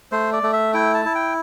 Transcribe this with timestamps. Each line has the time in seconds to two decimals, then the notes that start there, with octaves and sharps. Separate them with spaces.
0.12 A3 C5
0.33 D5
0.43 A3
0.53 E5
0.74 E4 G5
0.94 A5
1.05 E4
1.15 G5